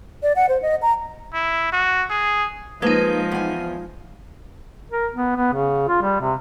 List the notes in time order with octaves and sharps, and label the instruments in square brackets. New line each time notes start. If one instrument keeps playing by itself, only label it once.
[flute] D5
F#5
C5
D#5
A#5
[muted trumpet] E4
F#4
G#4
[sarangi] F3 [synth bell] G#3 D#4 [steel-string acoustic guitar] A#3 B4
[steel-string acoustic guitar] E2 G#5
[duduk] A#4
B3
B3
C#3
F4
G3
C3